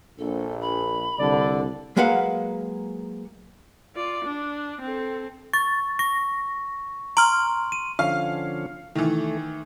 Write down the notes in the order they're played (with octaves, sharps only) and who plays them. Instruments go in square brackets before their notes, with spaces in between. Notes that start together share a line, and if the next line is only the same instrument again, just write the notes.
[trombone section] A#1 [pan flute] A4
[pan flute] B5
[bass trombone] C2 [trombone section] D3 [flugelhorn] D5
[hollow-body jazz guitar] F#3 G#3 A#3 B4 F5 F#5
[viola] F4 D5
D4
C4 A4
[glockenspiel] C#6 [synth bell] A6
[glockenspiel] C#6 [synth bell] A#6
[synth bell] A#5 F6 [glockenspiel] C6 D7 F#7
[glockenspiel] D#7
[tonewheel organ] D3 F3 C#4 [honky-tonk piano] F5
[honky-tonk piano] D#3 E3 [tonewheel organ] A3